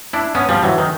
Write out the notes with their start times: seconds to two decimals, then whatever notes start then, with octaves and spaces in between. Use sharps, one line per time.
0.13 D4 E4
0.35 B3 C#4
0.49 F3 G3
0.63 E3 F#3
0.78 D#3